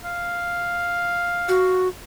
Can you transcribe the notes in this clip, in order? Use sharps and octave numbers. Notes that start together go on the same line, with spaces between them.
F5
F#4